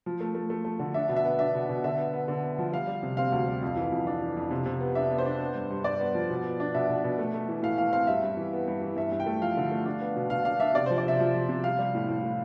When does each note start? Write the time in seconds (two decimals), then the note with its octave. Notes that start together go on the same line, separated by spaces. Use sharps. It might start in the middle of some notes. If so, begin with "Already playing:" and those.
0.06 F3
0.21 A3
0.35 A3
0.50 A3
0.65 A3
0.79 D3
0.94 D4 E5
1.09 B2
1.16 E5
1.25 B3
1.39 D4 E5
1.55 B2
1.69 B2
1.84 D3 E5
1.98 B3
2.13 B3
2.28 D3
2.44 B3
2.58 F3
2.72 G3 F5
2.87 G3
3.03 C3
3.17 C4 F5
3.32 D2
3.47 G3
3.63 F2
3.76 E3
3.92 F2
4.07 D4
4.22 E3
4.37 F2
4.51 C3
4.66 C3
4.80 B3
4.95 D4 E5
5.11 B3
5.18 C5
5.25 D4
5.40 B3
5.55 G2
5.71 G2
5.84 G2 D5
6.00 B3
6.14 F3
6.30 B2
6.44 B3
6.60 D4
6.74 B2 E5
6.89 B2
7.04 B2
7.19 A3
7.34 A3
7.49 E3
7.63 A2 F5
7.78 E3 F5
7.92 C4 F5
8.07 G2 E5
8.23 G2
8.37 E3
8.53 B3
8.68 G2
8.82 E3
8.96 G2 E5
9.12 G2
9.20 G5
9.26 A3
9.41 F3 F5
9.57 D3
9.71 A3
9.86 D4
10.01 B3
10.16 B2
10.30 B2 F5
10.45 D4 F5
10.60 D4 E5
10.75 C3 D5
10.86 F3 C5
10.98 D5
11.06 C3 E5
11.20 F3
11.34 F3
11.49 C3
11.64 G3 F5
11.79 G3
11.95 A2
12.08 A2
12.23 A2